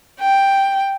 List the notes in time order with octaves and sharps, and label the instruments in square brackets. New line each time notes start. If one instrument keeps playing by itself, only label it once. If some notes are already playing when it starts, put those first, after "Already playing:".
[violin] G5